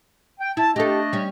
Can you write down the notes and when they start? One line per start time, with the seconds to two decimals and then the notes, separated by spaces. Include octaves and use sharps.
0.40 G5
0.57 E4 A5
0.76 A3 D4 G4 A4 D#5
1.13 G3 C#4